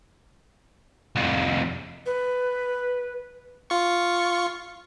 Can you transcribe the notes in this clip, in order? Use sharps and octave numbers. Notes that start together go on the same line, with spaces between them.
C2 F2
B4
F4 C#6